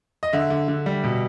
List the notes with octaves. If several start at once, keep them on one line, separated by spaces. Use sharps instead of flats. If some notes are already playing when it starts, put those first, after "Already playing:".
D#5
D3 E5
D3
D3
G3
B2